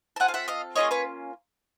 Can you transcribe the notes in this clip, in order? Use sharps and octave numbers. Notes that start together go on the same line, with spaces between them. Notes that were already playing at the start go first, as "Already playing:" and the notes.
A5
C4 F4 A4 F#5 G#5
F5
E5 F#5
D#5 F5
A#3 C#4 F4 G#4 C#5 D#5
B4 C#5